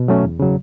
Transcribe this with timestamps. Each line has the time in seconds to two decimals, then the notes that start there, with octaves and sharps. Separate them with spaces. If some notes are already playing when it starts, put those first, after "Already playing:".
Already playing: B2
0.08 F#3 A3 C#4
0.24 E2
0.40 C#3 F#3